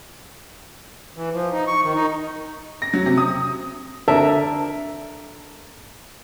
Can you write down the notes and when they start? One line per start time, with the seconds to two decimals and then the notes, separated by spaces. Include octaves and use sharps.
1.16 E3
1.33 F3
1.53 D#4
1.67 C#6
1.83 D#3
1.95 D#4
2.82 A#6
2.94 F#3
3.06 C3
3.18 D#6
4.08 D3 A#4 E5 A5